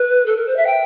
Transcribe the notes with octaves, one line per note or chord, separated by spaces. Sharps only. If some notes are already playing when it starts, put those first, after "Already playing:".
Already playing: B4
A4
A#4
C5
E5
G5